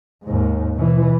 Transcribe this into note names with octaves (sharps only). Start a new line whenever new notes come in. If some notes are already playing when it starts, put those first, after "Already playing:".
D#2 G#2
B2 E3